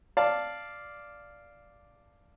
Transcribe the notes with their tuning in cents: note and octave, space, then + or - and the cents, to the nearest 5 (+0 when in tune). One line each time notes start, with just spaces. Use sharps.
D5 +0 F5 -5 A5 +0